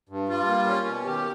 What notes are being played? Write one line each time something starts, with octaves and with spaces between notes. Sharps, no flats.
G2
G3 F4
A#3
C#4
B2
D#3 G4